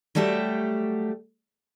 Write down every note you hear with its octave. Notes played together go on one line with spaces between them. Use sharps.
F#3 G3 A3 G4 E5